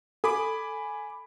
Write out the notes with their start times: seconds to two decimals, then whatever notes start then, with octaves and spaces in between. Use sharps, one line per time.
0.24 A4 G#5 B5 D6